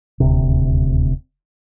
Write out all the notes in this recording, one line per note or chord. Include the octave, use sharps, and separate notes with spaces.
D#1 D2 C3